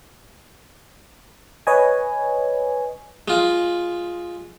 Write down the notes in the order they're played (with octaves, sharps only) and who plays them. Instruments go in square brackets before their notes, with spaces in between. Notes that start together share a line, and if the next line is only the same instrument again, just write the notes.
[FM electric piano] B4 C#5 D#5 G#5
[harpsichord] G#3 F4